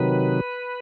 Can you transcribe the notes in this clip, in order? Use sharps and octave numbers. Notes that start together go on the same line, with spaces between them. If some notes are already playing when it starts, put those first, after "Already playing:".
Already playing: C3 D#3 F#3 B4